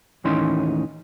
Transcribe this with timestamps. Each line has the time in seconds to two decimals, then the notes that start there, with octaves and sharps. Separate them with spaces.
0.24 D#2 A2 E3 C#4 D#4 C6